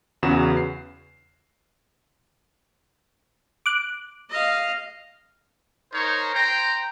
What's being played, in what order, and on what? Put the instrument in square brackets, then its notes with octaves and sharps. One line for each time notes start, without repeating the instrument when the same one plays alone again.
[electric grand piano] E2 C#3 B3 F#4 E7
C7
[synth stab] D6 F#6
[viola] D#5 F5
[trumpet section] D#4 A#4 C5 C#5
C5 G5 A#5